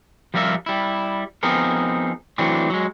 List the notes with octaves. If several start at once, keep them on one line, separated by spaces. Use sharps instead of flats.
F3 G3 F4 A#4 E5
G3 E4
F3 B3 C4 D#4 G#4 A#4
E3 F#3 A3 C4 D4
F#3 G#3